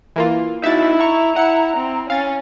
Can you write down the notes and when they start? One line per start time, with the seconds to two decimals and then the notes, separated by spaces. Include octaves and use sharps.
0.16 E3 A#3 F4
0.64 D#4 E4 F#4 E5 A6
1.00 A#5 C#6
1.36 E4 F#5 C#7
1.77 C4
2.10 C#4 F5 A6